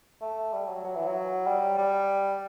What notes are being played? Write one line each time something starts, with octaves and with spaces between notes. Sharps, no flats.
A3
G3
F#3
F#3
E3
F#3
G3
G3